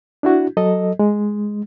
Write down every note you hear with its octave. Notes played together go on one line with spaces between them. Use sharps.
D4 E4 F#4
F#3 A4 D#5
G#3